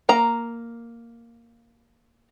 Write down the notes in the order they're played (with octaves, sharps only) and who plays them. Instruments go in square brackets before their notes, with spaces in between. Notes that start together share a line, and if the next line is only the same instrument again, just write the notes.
[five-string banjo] A#3 A#5